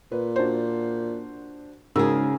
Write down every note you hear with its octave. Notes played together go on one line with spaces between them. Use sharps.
A#2 B4
D4 F#4 C5
G#2 C#3 F#4 G#4 A#4 E6